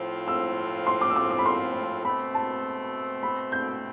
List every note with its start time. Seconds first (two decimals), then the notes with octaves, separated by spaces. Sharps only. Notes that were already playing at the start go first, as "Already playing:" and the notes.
Already playing: A2 F3 C4 F4
0.28 E6
0.87 C6
1.01 D6
1.10 E6
1.16 D6
1.31 D6
1.39 B5
1.46 C6
2.05 B2 A3 C4 B5
2.35 A5
3.23 B5
3.52 G6